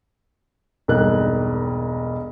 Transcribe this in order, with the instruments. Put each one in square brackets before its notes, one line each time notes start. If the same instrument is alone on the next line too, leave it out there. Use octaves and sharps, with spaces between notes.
[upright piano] E1 B1 G2 A#3 F#6